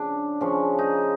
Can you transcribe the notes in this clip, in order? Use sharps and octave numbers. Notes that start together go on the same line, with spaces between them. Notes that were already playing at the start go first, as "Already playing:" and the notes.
Already playing: C#3 F3 D4
C#3 F3
D#4